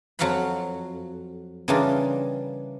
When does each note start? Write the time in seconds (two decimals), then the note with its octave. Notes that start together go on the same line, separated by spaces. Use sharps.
0.19 F2 F#3 F#4 F5 F#5 B5
1.68 C#3 E3 G3 D4 F4 A#4